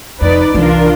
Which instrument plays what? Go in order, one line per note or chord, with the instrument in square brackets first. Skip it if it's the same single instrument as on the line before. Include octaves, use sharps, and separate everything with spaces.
[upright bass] F1 F2 [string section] D#4 B4 D5
[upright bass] C2 E3 [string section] D4 F4 A#4